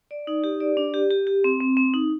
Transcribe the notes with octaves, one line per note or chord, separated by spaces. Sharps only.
D5
D#4
G4
D5
D4
G4
G4
G4
C4
C4
C4
D#4